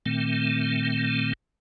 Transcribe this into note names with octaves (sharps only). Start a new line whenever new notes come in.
A#2 D#3 A3 C4